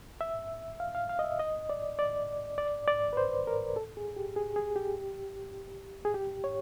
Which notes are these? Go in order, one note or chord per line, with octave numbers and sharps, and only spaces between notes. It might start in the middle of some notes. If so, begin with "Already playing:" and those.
E5
F5
F5
F5
D#5
E5
D#5
D5
D5
D5
D5
B4
C5
A#4
A4
G#4
G4
G#4
G#4
G4
G#4
G4
C#5